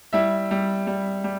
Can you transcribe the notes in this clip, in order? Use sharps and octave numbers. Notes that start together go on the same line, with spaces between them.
G3 E4 E5
G3
G3
G3